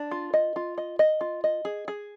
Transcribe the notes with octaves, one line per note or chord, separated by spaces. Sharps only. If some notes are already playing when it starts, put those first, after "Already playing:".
Already playing: D4
F4
D#5
F4
D#5
D#5
F4
D#5
G#4
G#4